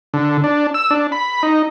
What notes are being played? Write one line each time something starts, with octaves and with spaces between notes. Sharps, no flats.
D3
D4
E6
D4
B5
D#4